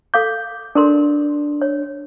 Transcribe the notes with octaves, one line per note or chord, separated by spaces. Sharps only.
A4 F5 D6 G6
D4 A4 A#4 C6
C#5